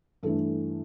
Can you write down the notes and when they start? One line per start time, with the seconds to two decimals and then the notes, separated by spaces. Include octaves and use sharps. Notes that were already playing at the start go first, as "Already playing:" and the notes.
0.23 G2 E3 A3 A4